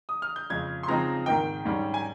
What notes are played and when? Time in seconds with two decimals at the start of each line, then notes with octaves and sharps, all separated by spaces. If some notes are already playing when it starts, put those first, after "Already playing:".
0.09 D#6
0.22 F6
0.36 G6
0.50 F2 C#3 G#3 G#6
0.83 C6
0.88 C#3 F3 G#3 C4 D#4 A#5
1.26 G#2 D#3 A#3 D#4 G5
1.65 G#2 G3 C#4
1.94 G#5